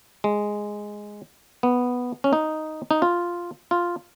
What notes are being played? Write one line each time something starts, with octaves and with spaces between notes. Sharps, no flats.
G#3
B3
C#4
D#4
D#4
F4
F4